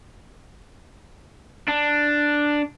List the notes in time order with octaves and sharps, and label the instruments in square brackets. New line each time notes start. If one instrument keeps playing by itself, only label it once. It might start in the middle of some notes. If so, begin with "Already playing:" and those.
[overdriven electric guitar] D4